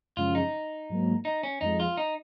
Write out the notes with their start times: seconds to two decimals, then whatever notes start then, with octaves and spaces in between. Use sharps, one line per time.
0.17 F#2 C#3 F3 G#3 C#4 F4
0.35 D#4
0.89 G#2 F#3 A#3
1.25 D#4
1.43 C#4
1.61 F2 F3 G#3 D#4
1.80 F4
1.97 D#4